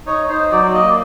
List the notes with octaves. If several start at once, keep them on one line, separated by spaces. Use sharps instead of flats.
D#4 C#5
D#4 C5
F#3 D5
A#3 D#5
D5